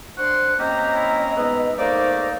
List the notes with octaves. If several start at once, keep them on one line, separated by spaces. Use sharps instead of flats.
D4 C5 F#5 C6
A#3 C4 C#4 G4 D#5 A#5
E4
G#2 B3 E5
G#2 A3 A#3 D#4 C5 D5